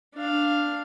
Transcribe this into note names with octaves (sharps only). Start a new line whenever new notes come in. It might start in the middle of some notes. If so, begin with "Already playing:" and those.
D4 F5